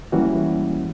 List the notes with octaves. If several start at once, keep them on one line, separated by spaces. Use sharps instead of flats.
E3 G3 G#3 A#3 C#4 F#4